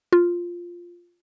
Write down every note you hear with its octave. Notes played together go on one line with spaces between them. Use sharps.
F4